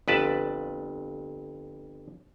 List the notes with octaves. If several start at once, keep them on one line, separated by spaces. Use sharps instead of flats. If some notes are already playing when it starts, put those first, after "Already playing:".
G1 F2 B4 D5 A5